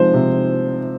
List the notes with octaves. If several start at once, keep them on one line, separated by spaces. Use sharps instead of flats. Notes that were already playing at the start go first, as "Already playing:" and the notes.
Already playing: C3 F3 G#3 C4 D#4 C5
C3